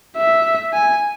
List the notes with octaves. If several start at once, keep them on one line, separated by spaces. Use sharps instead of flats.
E5
G#5